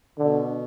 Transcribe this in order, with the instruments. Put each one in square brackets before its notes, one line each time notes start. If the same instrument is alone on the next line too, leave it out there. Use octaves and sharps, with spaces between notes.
[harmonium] B2 [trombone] D3